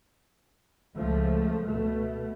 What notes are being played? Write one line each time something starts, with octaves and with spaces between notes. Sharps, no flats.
C#2 F3 A3
B2 A3